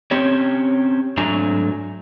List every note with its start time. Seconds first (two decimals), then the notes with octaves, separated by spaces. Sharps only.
0.11 C4 C#4 G4 C#5
1.17 G#2 F#3 A3 D4 G#5 A#5